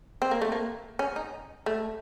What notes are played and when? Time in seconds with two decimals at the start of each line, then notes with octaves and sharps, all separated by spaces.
0.22 C4
0.31 A#3
0.42 A3
0.52 A#3
0.99 C#4
1.16 D#4
1.66 A3